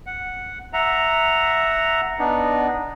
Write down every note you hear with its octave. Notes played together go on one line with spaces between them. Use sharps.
F#5
E5 F#5 A#5
B3 D4 D#4